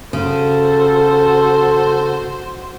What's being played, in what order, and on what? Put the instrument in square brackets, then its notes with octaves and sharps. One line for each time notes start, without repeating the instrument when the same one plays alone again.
[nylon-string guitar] C#3 [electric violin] F#4 C5 [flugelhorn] A4